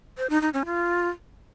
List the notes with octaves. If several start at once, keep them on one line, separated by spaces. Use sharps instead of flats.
C5
D#4
D#4
C#4
F4